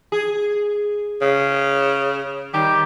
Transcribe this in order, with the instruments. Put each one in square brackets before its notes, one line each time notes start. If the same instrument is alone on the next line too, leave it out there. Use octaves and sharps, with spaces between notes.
[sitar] G#4
[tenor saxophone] C#3
[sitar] D#3 G3 [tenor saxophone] G4